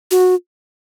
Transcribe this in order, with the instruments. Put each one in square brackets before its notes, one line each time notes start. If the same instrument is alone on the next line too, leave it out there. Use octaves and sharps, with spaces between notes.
[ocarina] F#4